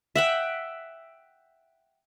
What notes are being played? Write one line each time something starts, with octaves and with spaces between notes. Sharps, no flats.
E5 F#5 G5